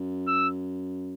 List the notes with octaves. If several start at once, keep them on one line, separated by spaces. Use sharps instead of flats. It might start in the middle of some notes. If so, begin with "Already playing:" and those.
Already playing: F#2
E6